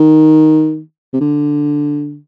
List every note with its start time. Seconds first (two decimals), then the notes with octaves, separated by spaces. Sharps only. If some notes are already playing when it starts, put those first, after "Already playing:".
Already playing: D#3
1.13 C3
1.21 D3